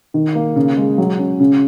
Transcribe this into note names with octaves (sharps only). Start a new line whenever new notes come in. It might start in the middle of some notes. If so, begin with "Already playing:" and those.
D#3
A#3
C#3
G#3
F#3
C#4
C#3